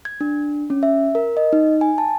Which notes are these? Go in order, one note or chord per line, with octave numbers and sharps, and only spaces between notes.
G#6
D4
C#4
E5
A#4
D#5
D#4
G#5
A5